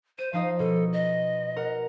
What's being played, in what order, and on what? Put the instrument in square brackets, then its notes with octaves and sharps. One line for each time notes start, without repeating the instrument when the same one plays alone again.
[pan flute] C5 [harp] D#7
[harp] F3 D#4 D#5 [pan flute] F5
[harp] B2 [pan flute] A4
[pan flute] D#5
[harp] A#4 F#5